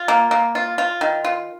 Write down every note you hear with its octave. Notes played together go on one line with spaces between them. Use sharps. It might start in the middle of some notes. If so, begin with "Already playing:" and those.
Already playing: F4
A#3
A#3
F4
F4
D#3
F4